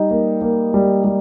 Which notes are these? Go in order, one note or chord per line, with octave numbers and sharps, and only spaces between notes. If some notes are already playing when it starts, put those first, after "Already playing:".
Already playing: G3 D#4
A#3
A#3
G3
G3